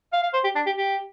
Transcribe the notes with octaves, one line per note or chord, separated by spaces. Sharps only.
F5
F5
C5
G4
D4
G4
G4